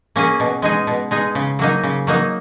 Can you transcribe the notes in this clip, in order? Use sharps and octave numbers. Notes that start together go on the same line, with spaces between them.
A#3 C#4 G#4
B2
G#3 D#4 G#4
B2
G#3 D#4 G#4
C#3
F#3 A#3 D#4
C#3
F#3 A#3 D#4